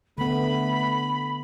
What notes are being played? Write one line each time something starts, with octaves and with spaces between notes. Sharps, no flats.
D3 A3 B3 B5